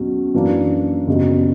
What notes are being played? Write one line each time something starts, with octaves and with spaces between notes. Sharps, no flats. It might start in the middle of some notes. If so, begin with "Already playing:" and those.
Already playing: E2 B2 F#3 C#4
F#2 E3 A#3 D4
F#1 E2 B2 G3